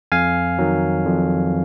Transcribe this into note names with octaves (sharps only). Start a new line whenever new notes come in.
F2 F5 G#5
D#3 F#3
F2